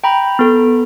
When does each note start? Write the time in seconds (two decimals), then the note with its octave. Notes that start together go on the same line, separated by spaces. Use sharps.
0.04 G5 A#5 B5
0.39 B3 A4